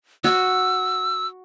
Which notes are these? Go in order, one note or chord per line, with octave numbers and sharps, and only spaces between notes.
F#4 E6